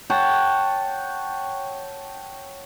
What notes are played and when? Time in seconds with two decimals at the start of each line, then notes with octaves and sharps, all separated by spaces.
0.10 C#5 F#5 G5 A5